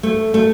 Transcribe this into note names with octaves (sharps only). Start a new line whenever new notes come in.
A3
A3